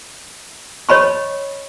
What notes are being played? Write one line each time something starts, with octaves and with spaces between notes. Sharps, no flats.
C#5 D#5 B5 C#6